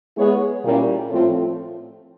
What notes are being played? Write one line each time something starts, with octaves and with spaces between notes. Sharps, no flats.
G#3 B3 E4 G#4 C#5
A#2 G3 A#3 C#4 E4
A2 F3 A3 C4 F4